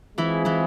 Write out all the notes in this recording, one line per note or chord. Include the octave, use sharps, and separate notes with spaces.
E3 G#3 C4 E4 F4 G#4
E3 E4